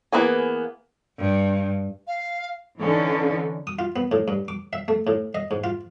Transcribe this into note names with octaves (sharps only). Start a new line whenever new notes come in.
E3 A#3 B3 G#4
G2
F5
D3 E3 C#4 D#4
D#6
F4
B3
A2
G2
D6
E5
A3
A2
D#5
G#2
F4